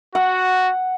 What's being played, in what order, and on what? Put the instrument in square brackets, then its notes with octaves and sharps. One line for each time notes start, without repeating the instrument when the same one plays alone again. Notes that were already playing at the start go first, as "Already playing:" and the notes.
[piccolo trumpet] F#4 [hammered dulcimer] F#5